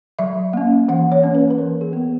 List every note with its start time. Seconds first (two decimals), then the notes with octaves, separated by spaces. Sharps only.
0.19 F#3 E5
0.53 A#3 C#4
0.88 E3 F#5
1.12 C#5
1.23 A#3 C#4
1.35 B4
1.50 B4
1.58 E3 A#4
1.81 G#4
1.93 B3 G#4